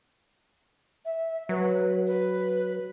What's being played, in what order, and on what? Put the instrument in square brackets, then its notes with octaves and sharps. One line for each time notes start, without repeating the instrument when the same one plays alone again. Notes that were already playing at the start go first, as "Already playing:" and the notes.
[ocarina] E5
[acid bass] F#3 [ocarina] B4
[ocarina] B4